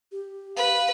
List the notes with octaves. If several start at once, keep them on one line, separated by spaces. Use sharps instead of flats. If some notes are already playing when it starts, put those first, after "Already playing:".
G4
B4 F5